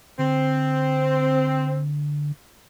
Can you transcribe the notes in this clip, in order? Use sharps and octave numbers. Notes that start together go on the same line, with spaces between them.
D3 C4